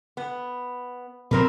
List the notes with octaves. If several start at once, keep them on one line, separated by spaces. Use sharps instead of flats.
B3
B2 F3 F#3 C4 A#4 B4